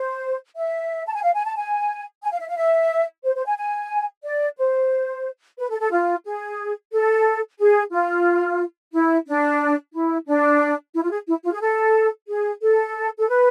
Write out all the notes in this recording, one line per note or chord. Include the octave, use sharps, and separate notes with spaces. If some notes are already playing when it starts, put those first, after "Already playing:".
Already playing: C5
E5
A5
G#5
F5
G#5
A5
G#5
G#5
F5
E5
F5
E5
C5
C5
G#5
G#5
D5
C5
B4
A4
A4
F4
G#4
A4
G#4
F4
E4
D4
E4
D4
E4
F4
G#4
E4
F4
G#4
A4
G#4
A4
A4
B4